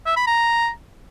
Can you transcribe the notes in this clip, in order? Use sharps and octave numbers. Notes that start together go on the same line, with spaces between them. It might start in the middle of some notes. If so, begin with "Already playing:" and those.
E5
B5
A#5